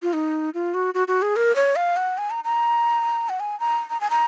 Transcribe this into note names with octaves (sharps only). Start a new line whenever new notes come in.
F4
D#4
F4
F#4
F#4
F#4
G#4
A#4
C#5
F5
F#5
G#5
A#5
A#5
F#5
G#5
A#5
A#5
G#5
A#5